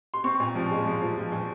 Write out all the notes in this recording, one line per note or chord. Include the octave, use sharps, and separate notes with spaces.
C6
C4 C#6
A#2
F3
G#3
F3
F3
F3
A#2